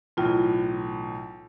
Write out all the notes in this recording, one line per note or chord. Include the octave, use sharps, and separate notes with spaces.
B1 A2 E3 F4